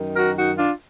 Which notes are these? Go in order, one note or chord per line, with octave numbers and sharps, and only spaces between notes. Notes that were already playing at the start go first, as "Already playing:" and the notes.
Already playing: F#2 D#3
F#4 A#4
D#4 F#4
D4 F4